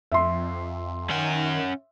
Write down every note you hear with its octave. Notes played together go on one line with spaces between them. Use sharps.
F2 E5 C6
D#3 C#4 F#5